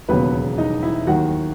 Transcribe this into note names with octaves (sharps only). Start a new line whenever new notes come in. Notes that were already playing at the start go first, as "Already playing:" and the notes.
E1 D#2 C#3 F#3 B3 B4
D#4 D#5
E4 E5
D#2 D#3 F#3 F#4 F#5